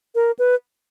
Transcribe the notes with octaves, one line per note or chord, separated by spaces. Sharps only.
A#4
B4